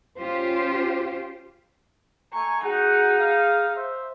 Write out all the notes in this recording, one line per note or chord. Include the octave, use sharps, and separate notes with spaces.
C#4 F4 G4 C5
A3 G#5 A#5 C#6
D#4 F#4 G#4 F#5
F5
C5 E5